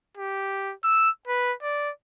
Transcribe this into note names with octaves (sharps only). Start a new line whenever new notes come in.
G4
E6
B4
D5